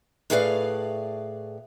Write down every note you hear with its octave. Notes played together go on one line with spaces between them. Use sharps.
A2 A3 G#4 B4 D5 F5